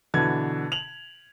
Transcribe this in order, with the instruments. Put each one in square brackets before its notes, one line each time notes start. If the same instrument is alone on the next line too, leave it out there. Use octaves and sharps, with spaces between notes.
[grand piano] B2 D3 E3 G#6
F7 F#7